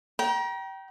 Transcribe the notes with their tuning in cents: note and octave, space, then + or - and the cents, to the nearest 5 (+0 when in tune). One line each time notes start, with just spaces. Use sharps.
G5 -20 A#5 +35